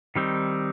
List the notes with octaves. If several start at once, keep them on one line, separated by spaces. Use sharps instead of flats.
D#3 G3 C4 D#4